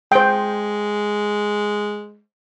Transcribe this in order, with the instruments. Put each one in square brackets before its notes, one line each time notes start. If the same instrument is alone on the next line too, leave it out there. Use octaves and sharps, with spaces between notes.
[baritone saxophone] G#3 [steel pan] C5 G5